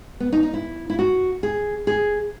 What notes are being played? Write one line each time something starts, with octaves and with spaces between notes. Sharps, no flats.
B3
D#4
D#4
E4
E4
F#4
G#4
G#4